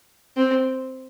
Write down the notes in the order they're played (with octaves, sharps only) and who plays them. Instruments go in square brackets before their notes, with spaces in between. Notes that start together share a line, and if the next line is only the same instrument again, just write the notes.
[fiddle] C4